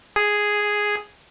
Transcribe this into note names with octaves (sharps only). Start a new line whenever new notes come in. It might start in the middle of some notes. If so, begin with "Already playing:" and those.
G#4